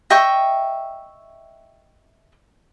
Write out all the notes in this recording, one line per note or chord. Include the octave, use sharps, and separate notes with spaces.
D#5 E5 G5 C#6